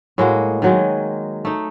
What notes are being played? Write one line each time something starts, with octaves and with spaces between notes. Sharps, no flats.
A2 G#3 A#3 F#4
D#3 F#3 G#3
A3 D#4